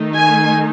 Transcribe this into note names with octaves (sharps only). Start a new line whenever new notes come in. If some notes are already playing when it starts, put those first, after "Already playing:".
Already playing: D#3 A3 D#4
G#5